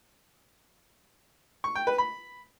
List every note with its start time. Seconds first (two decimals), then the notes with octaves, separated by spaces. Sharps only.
1.64 C#6
1.75 G5
1.87 B4
1.98 B5